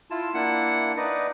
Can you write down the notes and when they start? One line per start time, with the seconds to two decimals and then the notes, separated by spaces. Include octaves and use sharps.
0.11 E4 F4 A5
0.34 A#3 D4 E4 F#5
0.97 D#4 B4 D5 D#5